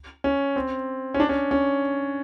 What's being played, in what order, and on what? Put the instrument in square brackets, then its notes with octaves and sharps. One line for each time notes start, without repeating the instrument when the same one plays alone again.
[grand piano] C#4
C4
C#4
D4
C#4
C#4